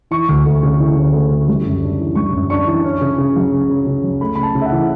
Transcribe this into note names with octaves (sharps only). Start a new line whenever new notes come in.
E3 C#6
D2
A3
C#3
E3
D2
A3
C#3
G3
F#2
D4
E3
G3 C#6
F#2
D4 C#6
E3
C#4
C#3
C#3
F#3
C#4
C#3
C#3
F#3
A3 B5
C#3 B5
A5
C#3
E5
F#5
E3